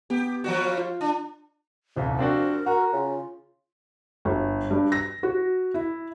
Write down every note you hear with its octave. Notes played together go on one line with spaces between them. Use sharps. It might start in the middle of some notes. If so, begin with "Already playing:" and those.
B3 G4
F3 G3 F#4
F5
F4
D4
D#1 C2 F3
C4 D4 F#4 A#4
F#4 A#5
C#3 F4
G1
G2
A#6
F#4
E4